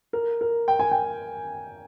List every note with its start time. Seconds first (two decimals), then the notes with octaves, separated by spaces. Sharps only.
0.13 A#4
0.41 A#4
0.68 G5
0.79 G#5
0.91 G5